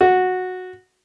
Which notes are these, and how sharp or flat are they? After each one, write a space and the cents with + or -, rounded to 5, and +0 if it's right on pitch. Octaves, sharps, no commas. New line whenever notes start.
F#4 -10